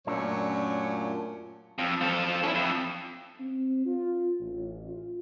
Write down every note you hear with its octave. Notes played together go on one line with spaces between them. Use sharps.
F#2 A#2 A3 C#4 D4 C#5
F2
F3 A4
C#4 E4
F2
C4
F4
A1
F4